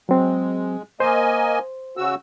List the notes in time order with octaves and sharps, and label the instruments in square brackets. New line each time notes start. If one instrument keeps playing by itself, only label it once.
[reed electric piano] F#3 C4 [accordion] G#3
[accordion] A#3 D#5 G#5 [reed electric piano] C5
[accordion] C#3 F#4 E6